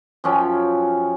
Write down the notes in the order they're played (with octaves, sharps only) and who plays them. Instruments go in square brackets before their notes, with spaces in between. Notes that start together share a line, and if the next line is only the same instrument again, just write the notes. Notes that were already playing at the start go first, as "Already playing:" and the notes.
[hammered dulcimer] F#2 F3 C#4 G5